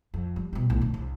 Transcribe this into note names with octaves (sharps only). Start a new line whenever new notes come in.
F2
G3
B2 G3
B1 A2
D3
C2